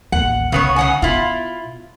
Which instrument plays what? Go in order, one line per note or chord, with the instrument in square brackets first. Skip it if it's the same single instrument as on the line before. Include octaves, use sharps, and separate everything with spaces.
[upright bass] A1 D#2 [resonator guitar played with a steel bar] F#5
[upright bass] C2 [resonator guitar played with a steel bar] C#3 B3 C#5
[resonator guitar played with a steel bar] C#3 F#5 G#5
[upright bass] B2 [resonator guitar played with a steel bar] E4 F4